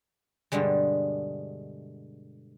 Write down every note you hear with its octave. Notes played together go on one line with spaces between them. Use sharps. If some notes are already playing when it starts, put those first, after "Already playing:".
G2 B2 D3 G3 G#3